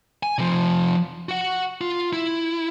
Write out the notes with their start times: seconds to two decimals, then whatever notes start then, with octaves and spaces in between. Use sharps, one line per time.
0.23 G#5
0.38 C3 F3
1.29 F#4 F#5
1.81 F4
2.13 E4